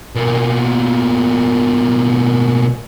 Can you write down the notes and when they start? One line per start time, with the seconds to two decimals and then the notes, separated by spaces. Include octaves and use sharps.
0.15 B2 A#3